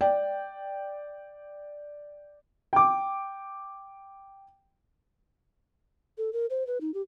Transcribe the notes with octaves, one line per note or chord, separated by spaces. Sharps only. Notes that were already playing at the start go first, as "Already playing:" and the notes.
D5 G5
G5 D6
A4
A#4
C5
B4
D#4
G4